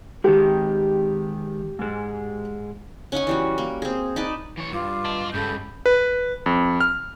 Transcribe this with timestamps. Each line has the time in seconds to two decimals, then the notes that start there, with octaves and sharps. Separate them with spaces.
0.24 D#3 G#3 G4
1.79 G#2 G#3
3.12 C#4 D#4 F#5 G#5
3.27 E3 G3 F#4
3.58 A#3
3.82 C4 G#4
4.16 D#4 B4 D5 A5
4.57 E3 C#5
4.72 G2 F4 D6
5.05 D#5 A5
5.34 C#2 G2 C#3 A4 B5 G6
5.86 B4
6.46 F2
6.81 F6